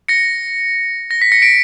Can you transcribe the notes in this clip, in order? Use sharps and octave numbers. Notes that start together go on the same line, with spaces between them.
A#6 C#7
A#6
B6
A#6 C#7
B6 D7